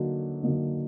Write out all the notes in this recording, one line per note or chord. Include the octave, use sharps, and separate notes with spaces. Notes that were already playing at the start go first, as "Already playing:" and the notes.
Already playing: D3 F#3 A#3 D#4
D3 F#3 A#3 D#4